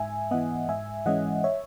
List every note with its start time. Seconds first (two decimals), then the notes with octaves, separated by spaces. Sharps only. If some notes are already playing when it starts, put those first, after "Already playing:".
Already playing: G#2 E5 G#5
0.31 E3 B3 D#5 F#5
0.68 G#2 E5 G#5
1.06 E3 G#3 C#4 D#5 F#5
1.44 C#5 E5